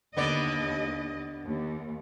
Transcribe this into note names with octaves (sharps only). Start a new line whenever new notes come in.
D#2 D3 B3 D5 D#5
D#2